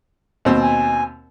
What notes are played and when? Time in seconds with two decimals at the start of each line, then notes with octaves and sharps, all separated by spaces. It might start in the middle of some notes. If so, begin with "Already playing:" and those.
0.45 D#2 B2 C4
0.62 G#5